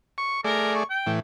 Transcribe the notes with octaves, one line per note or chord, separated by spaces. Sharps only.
C#6
A3 G#4 A#4 D5
C#6
G5
A2 E3